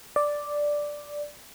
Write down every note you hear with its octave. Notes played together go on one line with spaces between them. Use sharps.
D5